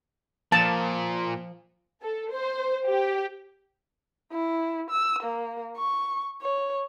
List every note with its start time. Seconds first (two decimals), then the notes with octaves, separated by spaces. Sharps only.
0.52 A#2 F3 A5
2.02 A4
2.32 C5
2.88 G4
4.32 E4
4.90 E6
5.23 A#3
5.77 C#6
6.42 C#5